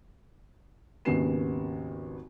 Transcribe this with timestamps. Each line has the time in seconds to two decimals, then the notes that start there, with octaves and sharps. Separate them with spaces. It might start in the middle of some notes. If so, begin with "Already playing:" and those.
1.05 G#1 D#2 C#3 B3 C7 E7